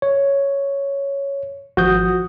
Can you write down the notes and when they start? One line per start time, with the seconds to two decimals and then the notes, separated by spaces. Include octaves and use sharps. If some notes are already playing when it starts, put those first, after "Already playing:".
0.02 C#5
1.77 G#1 F3 F#4 D#6 G6